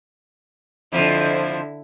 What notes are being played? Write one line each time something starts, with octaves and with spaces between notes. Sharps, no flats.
F2 D3 F3 E4